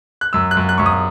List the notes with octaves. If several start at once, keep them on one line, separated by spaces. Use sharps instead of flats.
F#6
F#2 E6
F#6
F#2
F#6
F#2 C#6
D#6